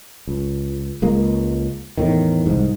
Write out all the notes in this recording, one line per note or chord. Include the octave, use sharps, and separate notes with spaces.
C#2
C#2 G#3 A#3
E2 A2 D#3
C2 G#2